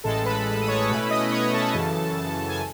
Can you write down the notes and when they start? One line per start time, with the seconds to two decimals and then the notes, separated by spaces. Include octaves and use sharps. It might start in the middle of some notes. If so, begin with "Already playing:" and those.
0.04 A1 A2 G#3 A4 A5
0.25 B4 B5
0.61 D#6
0.68 C#5 C#6
0.89 B2 A3 C#4 E4 B4 B5
1.10 D#5 D#6
1.32 C#5 C#6
1.53 A4 A5
1.74 F#2 C#3 E3
2.48 G#5